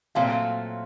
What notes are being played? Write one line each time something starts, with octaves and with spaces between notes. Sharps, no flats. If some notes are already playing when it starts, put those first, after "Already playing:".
A#2 F#3 A3 C4 F4 F5